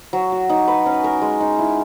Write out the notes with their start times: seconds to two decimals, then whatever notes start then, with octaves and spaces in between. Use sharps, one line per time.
0.13 F#3
0.32 F#4
0.49 D#4
0.68 B4
0.86 C#4
1.04 A#4
1.22 G#3
1.40 D#4
1.59 E4